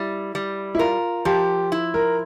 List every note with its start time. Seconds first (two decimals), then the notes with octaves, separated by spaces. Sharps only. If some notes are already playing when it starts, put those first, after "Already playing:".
Already playing: G3 E4
0.35 G3
0.75 E4
0.79 F4 A#4
1.25 F3 G4
1.72 E4
1.94 A#4